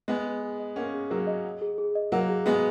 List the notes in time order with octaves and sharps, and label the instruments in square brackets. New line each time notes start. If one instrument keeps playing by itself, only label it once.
[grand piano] G#3 B3 [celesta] F#5
[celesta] G#4
G#4
D#5
[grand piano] A#3 C#4 [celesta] F#5
[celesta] G#4
[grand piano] F#3 A#3 [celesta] G#4
[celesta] D#5
F#5
G#4
G#4
D#5
[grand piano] F#3 A#3 [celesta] F#5
[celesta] G#4
[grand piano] G#3 B3 [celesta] G#4